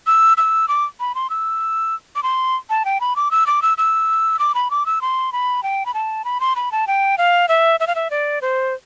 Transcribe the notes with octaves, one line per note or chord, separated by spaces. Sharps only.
E6
E6
D6
B5
C6
E6
D6
C6
A5
G5
B5
D6
E6
D6
E6
E6
D6
B5
D6
E6
C6
B5
G5
B5
A5
B5
C6
B5
A5
G5
F5
E5
E5
F5
E5
D5
C5